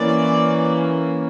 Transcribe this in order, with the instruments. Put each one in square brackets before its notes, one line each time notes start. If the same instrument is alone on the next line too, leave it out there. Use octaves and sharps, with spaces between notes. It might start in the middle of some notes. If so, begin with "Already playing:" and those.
Already playing: [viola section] E3 A#3 C#4 D5